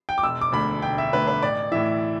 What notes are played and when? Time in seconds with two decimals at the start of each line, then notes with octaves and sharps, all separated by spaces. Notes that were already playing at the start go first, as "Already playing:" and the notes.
0.09 G5
0.18 D6
0.23 E1 E6
0.41 D6
0.52 D2 D3 B5
0.82 E1 G5
0.98 E5
1.13 D2 D3 B4
1.27 B4
1.42 A1 D5
1.72 A2 E3 E5